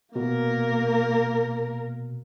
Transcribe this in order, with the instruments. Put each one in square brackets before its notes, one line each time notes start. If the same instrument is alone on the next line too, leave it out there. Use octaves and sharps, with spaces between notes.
[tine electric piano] B2 [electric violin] A#3 A#4